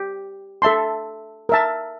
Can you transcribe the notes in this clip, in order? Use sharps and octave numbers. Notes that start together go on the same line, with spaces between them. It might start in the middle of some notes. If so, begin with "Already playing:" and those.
Already playing: G4
A4 E5 A5 C6
A#4 E5 A5